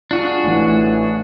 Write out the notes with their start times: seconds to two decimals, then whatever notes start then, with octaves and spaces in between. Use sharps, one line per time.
0.11 D4 F4 F#4 G#4
0.43 A1 A2 E3